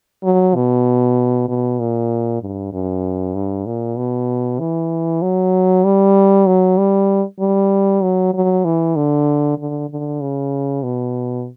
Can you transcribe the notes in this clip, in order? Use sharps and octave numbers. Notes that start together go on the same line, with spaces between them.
F#3
B2
B2
A#2
G2
F#2
G2
A#2
B2
E3
F#3
G3
F#3
G3
G3
F#3
F#3
E3
D3
D3
D3
C#3
B2